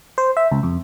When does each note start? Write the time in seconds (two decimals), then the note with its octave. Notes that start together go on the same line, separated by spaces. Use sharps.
0.18 C5
0.37 E5
0.52 C#2
0.63 F2